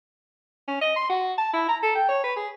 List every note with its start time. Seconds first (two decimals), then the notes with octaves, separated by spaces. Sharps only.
0.68 C#4
0.81 D#5
0.96 C6
1.09 F#4
1.38 A5
1.53 E4
1.68 A#5
1.83 A4
1.95 G5
2.09 C#5
2.24 B4
2.36 G#4